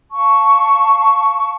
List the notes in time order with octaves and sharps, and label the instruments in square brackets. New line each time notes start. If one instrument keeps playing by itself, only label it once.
[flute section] F5 A5 C#6